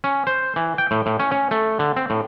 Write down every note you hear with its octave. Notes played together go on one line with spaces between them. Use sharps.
C#4
C5
E3
G5
A2
A2
C#4
C#4
A3
D3
C4
A2